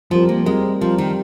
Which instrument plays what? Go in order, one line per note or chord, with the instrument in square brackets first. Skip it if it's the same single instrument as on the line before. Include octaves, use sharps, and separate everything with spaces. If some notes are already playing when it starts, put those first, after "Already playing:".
[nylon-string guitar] F3 [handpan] G3 C4 G4 A#4
[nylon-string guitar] A#3
[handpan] G3 C4 G4 A#4 [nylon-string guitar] G#3
[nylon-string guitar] F3 [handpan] G3 C4 G4 A#4
[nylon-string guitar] D#3